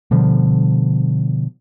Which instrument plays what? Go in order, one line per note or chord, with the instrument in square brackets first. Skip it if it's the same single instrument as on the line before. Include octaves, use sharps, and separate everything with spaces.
[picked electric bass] B2 D3 F3 G3